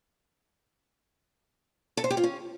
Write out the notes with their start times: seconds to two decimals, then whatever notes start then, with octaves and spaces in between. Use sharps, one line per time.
1.97 A4
2.04 C5
2.10 G4
2.17 F4
2.24 C#4